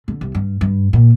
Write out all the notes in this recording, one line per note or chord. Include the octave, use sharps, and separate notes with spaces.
D3
C2
G2
G2
A#2